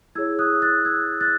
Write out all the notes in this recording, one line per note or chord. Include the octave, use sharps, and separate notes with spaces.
E4 G#4 C#5 E6 G#6
D#6 F#6
F#6 A6
E6 G#6
F#6 A6